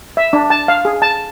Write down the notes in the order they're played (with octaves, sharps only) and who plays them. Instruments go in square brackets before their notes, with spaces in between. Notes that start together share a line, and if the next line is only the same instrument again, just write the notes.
[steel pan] E5
D4
A5
F5
G#4
A5